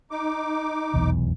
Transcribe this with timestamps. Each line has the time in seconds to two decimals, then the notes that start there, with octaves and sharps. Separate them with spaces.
0.11 D#4 D6
0.94 F1 B1 E2